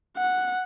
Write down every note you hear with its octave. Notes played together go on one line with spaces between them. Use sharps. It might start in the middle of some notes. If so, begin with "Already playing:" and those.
F#5